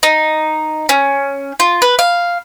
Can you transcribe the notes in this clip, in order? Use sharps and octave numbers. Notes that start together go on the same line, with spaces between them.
D#4
C#4
F4
B4
F5